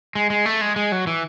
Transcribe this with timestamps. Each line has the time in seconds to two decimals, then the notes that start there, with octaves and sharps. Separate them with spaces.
0.15 G#3
0.30 G#3
0.46 A3
0.61 G#3
0.76 G#3
0.92 F#3
1.07 E3